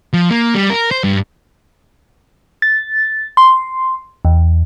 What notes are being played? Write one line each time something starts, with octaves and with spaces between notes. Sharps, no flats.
F3
A#3
G3
A#4
C5
G2
A6
C6
E2